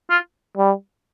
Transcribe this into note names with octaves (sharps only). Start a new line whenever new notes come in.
F4
G3